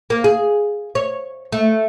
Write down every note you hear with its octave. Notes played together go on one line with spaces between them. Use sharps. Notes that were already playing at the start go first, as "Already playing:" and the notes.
A#3
G#4
C#5
A3